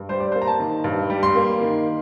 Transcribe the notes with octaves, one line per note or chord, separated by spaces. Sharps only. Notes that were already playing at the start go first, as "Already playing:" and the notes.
Already playing: G2
G3 C5
D5
A#3 C5
A#5
A5
D#3
G2
G3
C6
A#3
D#3